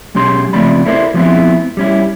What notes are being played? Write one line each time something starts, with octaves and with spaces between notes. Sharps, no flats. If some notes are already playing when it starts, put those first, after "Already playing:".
B1 F#3 G#3 C#4 G4 C6
C#3 F3 A3 C4 D5 B5
E4 A4 A#4 C5 D5 E5
F3 G3 G#3 B3 C4 E4
G3 C#4 E4